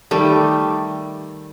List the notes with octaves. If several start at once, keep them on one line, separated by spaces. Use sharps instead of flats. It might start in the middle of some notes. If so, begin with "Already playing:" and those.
D#3 G3 A3